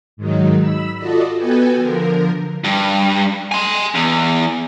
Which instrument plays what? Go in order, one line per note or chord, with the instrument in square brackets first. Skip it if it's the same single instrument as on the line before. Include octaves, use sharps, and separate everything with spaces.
[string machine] G#2 D#3 F#3 D#4
B5 E6
F4 F#4 A4 D5 D#5
B3 F#4 A4 B4 G5 G#5
D3 F3 A#4
[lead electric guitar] G2
G#5 C6
E2